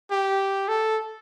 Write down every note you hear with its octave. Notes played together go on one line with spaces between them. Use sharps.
G4
A4